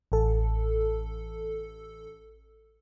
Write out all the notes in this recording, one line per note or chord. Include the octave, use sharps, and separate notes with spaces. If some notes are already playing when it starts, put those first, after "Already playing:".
A1 A4